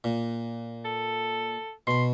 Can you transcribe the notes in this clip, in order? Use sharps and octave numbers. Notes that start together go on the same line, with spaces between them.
A#2
A4
B2 B5 C6